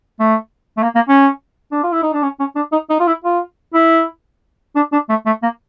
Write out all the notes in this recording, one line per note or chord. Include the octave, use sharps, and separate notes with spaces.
A3
A3
A#3
A#3
C#4
D4
F4
E4
D#4
D4
C#4
C#4
D4
D#4
D#4
F4
E4
F4
E4
D4
D4
A3
A3
A#3